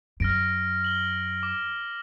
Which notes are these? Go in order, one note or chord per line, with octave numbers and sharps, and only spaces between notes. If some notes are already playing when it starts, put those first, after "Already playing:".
F#2 F6 A#6 D7
F#7 G7
D6